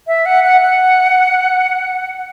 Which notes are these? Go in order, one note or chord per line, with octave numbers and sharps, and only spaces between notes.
E5
F#5
F#5
F#5